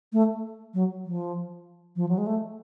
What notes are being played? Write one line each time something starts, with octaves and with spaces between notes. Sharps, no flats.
A3
F#3
F3
F3
F#3
G#3
A3